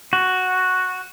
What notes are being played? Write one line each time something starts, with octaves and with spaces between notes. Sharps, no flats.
F#4